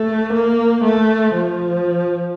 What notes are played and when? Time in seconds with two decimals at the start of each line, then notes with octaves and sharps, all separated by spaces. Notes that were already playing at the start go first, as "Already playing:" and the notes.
Already playing: A3
0.34 A#3
0.84 A3
1.35 F3